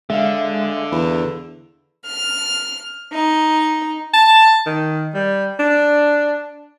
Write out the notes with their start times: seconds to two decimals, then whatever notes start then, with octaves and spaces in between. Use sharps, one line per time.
0.10 D3 G#3 E5 F5
0.92 E2
2.05 F6
3.11 D#4
4.14 A5
4.66 D#3
5.14 G3
5.59 D4